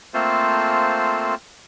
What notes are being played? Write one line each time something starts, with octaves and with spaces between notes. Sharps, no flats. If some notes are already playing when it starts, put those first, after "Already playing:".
A3 A#3 C4 F4 A4 C5